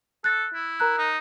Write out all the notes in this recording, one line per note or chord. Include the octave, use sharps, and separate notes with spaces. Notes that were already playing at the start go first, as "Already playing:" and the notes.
A4 F#6 A6
E4
A#4 A#5 F#6
D#4